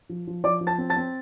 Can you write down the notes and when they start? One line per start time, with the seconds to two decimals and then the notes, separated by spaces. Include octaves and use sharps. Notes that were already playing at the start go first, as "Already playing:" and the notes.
0.09 F3
0.27 F3
0.44 F3 D5 D6
0.61 F3
0.67 A5 A6
0.78 C4
0.90 A5 A6
0.96 C4